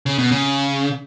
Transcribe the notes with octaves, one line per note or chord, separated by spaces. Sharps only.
C#3
B2
C#3